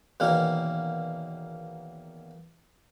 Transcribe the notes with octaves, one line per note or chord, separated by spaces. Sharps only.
E2 B2 D#3 A#3 C#4